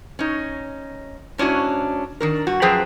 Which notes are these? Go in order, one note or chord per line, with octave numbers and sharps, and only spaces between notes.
C#4 D#4
G#2 C#4 D4 E4 F#4
D#3 D4 A#4
G2 F#4
F#2 F3 G#4 B4 C5 G5